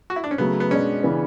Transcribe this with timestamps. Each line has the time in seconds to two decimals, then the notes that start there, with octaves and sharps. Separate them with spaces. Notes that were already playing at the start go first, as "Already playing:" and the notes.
0.10 F#4
0.16 E4
0.24 D4
0.31 C#4
0.38 C#3 F#3 A3 B3
0.60 B3
0.70 B2 G#3 C#4 D4
1.03 C#3 E3 B3 D4